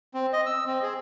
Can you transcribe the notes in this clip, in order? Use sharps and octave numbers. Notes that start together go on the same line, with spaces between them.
C4
D#5
E6
C4
G#4